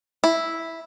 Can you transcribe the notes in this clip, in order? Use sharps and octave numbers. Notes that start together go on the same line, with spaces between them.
E4